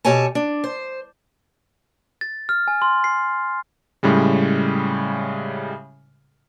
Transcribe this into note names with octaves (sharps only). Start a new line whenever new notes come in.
B2 G4 A4 C#5 G#5 A5
D4
C5
A6
F6
G#5
C6
C7
A2 C#3 G3 G#3